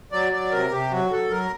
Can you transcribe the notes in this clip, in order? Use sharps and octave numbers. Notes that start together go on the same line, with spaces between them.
F#3 D5
F#3 D5
C3 A#4
C3 G4
F#3 F#4
F#3 A4
F#3 A#4